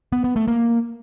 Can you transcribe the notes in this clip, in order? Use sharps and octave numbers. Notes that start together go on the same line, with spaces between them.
B3
B3
A3
A#3